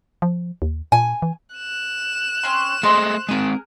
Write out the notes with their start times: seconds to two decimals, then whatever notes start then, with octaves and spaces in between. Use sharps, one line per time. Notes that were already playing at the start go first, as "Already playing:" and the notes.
0.22 F3
0.62 D#2
0.92 A#2 G#5
1.22 E3
1.56 F#6 E7
2.43 C4 C#4 C6
2.83 A3 G#4 C5 D#5 C6
3.29 G#3 C4 G#4 A#4